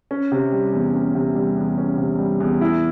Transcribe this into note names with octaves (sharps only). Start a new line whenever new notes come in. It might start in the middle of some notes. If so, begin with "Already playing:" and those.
C#4
C3
G3
E2
C#4
C3
G3
E2
C#4
C3
G3
E2
E4